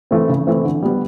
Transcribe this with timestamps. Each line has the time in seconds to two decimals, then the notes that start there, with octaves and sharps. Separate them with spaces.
0.11 E3 A3 C4
0.29 C#3
0.47 E3 A3 C4
0.65 D3
0.82 G3 B3